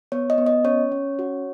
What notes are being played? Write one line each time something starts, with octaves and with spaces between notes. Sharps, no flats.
B3 C#5
D#5
B3
D#5
C#4 C#5
C#4
F#4